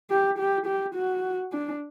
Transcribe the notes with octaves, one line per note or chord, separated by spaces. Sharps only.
G4
G4
G4
F#4
D4